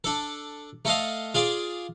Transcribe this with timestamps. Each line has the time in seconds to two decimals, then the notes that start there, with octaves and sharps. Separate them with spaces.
0.04 D4 A4
0.85 A3 A4 D#5 F5
1.34 F4 G#4 D5